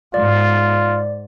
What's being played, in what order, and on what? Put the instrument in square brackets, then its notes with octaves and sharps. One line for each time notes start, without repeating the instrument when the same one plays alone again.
[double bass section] G#2 [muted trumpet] F4 [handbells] D5